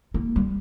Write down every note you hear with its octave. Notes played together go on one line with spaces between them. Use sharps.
A#3
G3